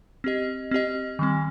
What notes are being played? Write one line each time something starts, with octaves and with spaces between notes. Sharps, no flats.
C4 G4 D#5
C4 G4 D#5
D#3 G3 C4